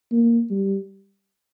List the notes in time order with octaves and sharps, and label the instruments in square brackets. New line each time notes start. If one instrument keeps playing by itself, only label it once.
[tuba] A#3
G3